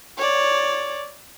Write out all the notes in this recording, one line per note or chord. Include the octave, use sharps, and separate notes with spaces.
C#5 D5